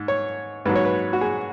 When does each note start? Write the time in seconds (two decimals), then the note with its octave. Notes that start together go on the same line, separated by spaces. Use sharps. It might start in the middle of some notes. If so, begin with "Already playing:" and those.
Already playing: G#2
0.08 C#5
0.66 G#2 F#3 B4
0.75 C#5
0.85 B4
1.13 F#4
1.21 G#4